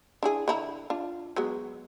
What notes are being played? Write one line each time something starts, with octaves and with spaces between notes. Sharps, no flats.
D4 E4 G#4
D3 E4 A#5
D4 F4
F#3 G#3 B3